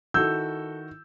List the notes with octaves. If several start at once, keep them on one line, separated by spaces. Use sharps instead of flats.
D#3 E4 F#4 A4 E6 G6